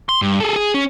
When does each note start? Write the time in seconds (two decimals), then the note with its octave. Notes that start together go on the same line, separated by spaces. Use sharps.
0.09 C6
0.22 G2
0.40 G#4 A4
0.56 G#4
0.74 C#4